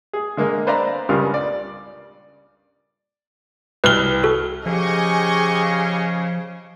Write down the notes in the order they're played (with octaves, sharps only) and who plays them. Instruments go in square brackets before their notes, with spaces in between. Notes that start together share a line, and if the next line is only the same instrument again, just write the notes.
[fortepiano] G#4
D3 G#3 A#3
B4 C5 D5 E5 F5 A#5
C#2 G2 C#3 G3 F4 A#4
D5
[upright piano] C2 F6 G7 [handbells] B4
[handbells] F#4 A4
[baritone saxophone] C#3 [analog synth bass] F3 [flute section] G4 G#4 [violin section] D#5 G#5 C#6